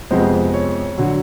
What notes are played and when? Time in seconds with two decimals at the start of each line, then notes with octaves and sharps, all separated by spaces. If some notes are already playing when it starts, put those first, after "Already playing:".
0.10 F2 C3 F3 G#3 B3 C5
0.54 C#5
0.97 D3 F#3